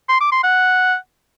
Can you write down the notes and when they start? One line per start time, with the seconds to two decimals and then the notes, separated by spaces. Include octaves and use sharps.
0.09 C6
0.21 D6
0.32 C6
0.44 F#5